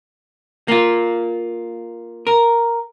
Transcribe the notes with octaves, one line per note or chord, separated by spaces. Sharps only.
A#3 F4
A#4